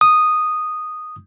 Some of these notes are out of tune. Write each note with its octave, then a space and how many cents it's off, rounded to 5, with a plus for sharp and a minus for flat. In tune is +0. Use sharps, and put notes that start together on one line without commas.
D#6 -5